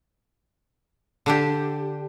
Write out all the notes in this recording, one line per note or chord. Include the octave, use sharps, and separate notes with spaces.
D3 D4 G4